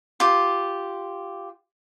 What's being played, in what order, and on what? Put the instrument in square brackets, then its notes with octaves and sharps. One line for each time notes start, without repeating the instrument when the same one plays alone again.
[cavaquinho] F4 G4